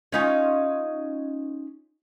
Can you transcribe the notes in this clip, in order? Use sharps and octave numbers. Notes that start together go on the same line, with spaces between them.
C#4 D#4 F4